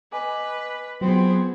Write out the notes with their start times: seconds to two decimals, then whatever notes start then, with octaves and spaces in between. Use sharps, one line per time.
0.12 B4 D#5 G#5 D6
1.01 F#3 B3 C4 F4 G#4